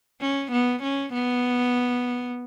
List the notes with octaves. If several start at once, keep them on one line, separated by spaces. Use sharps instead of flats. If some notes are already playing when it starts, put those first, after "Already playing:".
C#4
B3
C#4
B3